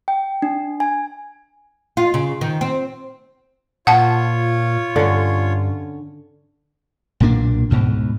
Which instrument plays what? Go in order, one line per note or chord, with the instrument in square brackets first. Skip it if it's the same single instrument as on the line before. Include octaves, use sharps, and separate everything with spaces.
[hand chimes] G5
D4
G#5
[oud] F4
C#3
D#3
C4
[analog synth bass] A#2 [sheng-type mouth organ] F4 C#5 [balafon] F#5 A5
[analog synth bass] G2 [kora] D3 C#4
[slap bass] B1 A#2 A#3 D4
D2 G#2 B2